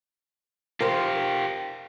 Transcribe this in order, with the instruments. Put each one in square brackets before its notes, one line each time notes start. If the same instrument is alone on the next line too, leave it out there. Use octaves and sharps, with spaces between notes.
[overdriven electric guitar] F4 G4 [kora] A#4 C5